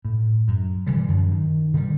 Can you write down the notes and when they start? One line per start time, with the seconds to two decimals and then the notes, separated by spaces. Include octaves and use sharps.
0.05 A2
0.48 F#2
0.87 D3 E3 F3 G3
1.08 F#2
1.32 D#3
1.74 D3 D#3 G3